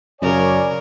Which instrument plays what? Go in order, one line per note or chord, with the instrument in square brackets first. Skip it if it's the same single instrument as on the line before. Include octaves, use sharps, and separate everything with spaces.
[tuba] F#2 [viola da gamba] C#3 A#4 [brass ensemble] C#5 D5 G#5